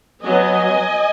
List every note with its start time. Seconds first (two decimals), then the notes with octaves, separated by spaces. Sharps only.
0.23 F#3 B3 D#5 G#5